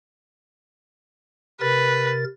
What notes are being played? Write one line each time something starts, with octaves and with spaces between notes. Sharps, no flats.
C3 A#4 B4 A6